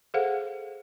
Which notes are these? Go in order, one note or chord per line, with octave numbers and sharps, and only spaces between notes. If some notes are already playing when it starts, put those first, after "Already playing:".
G#4 A4 C5 F5 F#5